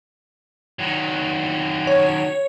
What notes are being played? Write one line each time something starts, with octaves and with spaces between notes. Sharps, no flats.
D#3 F#3
C#5